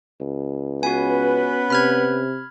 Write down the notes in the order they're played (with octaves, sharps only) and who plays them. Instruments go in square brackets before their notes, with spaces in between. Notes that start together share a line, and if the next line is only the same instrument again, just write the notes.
[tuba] C#2
[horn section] B3 C#4 B4 [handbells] F#4 G#5
[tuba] C3 [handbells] B5 F6 G#6